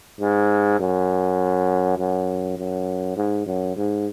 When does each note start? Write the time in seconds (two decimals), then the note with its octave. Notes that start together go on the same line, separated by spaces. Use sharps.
0.20 G#2
0.79 F#2
1.98 F#2
2.58 F#2
3.16 G#2
3.46 F#2
3.76 G#2